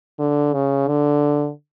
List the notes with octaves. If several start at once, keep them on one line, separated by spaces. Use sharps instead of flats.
D3
C#3
D3